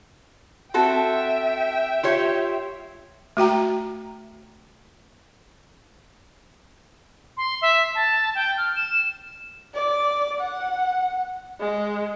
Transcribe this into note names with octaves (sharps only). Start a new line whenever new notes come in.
C4 F#4 A4 E5 G5
F4 G4 C#5
A3 F#4 G5 A#5
C6
E5
A5
G5
F6
E7
D5
F#5
G#3